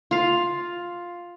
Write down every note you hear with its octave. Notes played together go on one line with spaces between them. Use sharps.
F4 F5